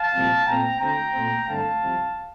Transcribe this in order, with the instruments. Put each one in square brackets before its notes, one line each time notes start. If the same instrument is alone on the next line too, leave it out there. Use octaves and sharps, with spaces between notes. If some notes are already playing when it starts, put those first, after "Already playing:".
Already playing: [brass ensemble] F5 A5
C2 A#2 F3 C4
A#2 A3 C4 G5 A#5
D2 D3 A3 C4 G5 A#5
A#2 A3 C4
G2 D3 A3 C4 F5 A5
C2 C3 F3